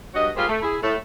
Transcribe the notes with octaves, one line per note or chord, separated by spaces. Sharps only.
G2 F#4 C#5 D#5
G3 G#3 A#3 F4 G#4 C5
A3
E4 G#4
A2 A3